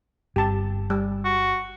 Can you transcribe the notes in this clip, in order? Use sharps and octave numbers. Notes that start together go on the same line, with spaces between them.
G1 G2 C4 G4 A5
G3
F#4